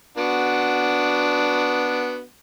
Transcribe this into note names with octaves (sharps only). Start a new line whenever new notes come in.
B3 D4 F#4